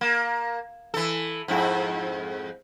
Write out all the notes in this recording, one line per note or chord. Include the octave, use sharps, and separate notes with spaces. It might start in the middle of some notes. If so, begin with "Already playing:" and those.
A#3
E3 A4
F2 G#2 E4